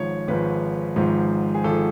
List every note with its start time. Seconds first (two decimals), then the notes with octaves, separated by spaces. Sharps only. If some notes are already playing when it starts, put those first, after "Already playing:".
Already playing: G#1 G#2 F3 C#5
0.28 G#1 G#2 F3 B4
0.96 G#1 G#2 F3
1.54 G#4
1.64 G#1 F3 A4